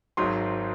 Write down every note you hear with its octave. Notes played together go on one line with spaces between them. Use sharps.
G#1 G#2 F#3 C6